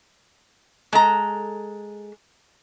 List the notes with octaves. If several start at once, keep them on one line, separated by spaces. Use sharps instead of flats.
G#3 A4 A#5